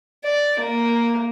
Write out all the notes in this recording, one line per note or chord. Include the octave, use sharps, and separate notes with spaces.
D5
A#3